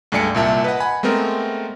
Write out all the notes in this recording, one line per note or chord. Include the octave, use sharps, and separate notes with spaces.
C#2 G2 A3 D5 G#5 C#7
C2 A#2 E5 A5
B4 D#5 F#5
F#5 G#5 B5
G#3 A3 B3 C4 A#4